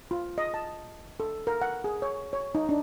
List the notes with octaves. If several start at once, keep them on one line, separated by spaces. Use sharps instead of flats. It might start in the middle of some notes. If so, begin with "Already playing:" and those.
F4
D#5
A5
A4
A#4
F#5
G#4
C#5
C#5
D#4
D4